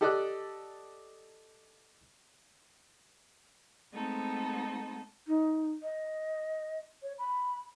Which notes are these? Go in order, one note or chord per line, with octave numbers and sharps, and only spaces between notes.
G4 A4 D5 D#5 D6 F#6
G#3 A3 B3 C4 D#4 A4
D#4
D#5
C#5
B5